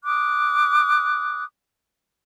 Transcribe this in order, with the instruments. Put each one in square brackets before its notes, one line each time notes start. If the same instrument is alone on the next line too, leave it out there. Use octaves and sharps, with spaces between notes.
[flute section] D6 D#6 F#6